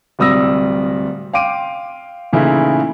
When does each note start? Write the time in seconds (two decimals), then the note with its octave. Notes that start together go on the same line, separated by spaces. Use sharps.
0.19 D1 C3 G3 D#6 E6 A#6
1.33 F5 G5 C6 D6 D7 D#7
2.33 A#2 C#3 E3 A3 D#4 E4